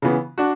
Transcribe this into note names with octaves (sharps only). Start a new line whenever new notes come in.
C#3 E3 B3
D4 F#4